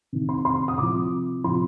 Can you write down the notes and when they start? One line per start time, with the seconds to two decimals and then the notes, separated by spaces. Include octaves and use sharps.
0.13 C3 D#3
0.29 C6
0.45 C6
0.68 D#6
0.78 C3 F3 D6
1.44 F3 C6
1.47 C3